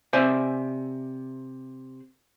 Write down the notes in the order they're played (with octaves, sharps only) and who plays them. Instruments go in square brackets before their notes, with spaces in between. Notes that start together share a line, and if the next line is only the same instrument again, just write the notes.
[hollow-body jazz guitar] C3 C5 D5 E5 G#5